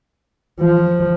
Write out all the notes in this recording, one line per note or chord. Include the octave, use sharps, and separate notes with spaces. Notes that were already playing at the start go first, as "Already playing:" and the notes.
F3